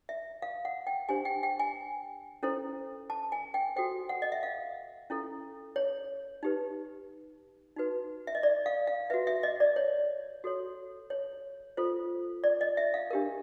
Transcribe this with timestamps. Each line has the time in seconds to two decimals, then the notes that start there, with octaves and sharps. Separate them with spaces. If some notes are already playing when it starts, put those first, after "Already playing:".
0.09 E5
0.42 F5
0.65 F#5
0.87 G5
1.09 D4 G4 C5 G#5
1.25 G5
1.43 G5
1.60 G#5
2.43 C#4 E4 A4 C5
3.10 A5
3.32 G#5
3.54 G5
3.76 F#4 A4 C5 G5
4.09 F#5
4.22 D#5
4.32 E5
4.43 F5
5.10 C#4 E4 A4
5.76 C#5
6.43 D#4 G4 B4
7.76 D#4 F#4 B4
8.27 E5
8.35 D#5
8.43 D5
8.66 F5
8.87 F5
9.10 F#4 B4 E5
9.27 E5
9.43 D#5
9.60 D5
9.76 C#5
10.44 F#4 A4 C#5
11.10 C#5
11.77 F4 A4 C5
12.44 D5
12.61 D#5
12.77 E5
12.94 F5
13.11 D4 G4 A#4